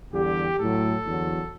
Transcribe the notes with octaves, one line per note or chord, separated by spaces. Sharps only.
E2 D3 G3 G4
A2 F#3 A4
E2 D3 F#3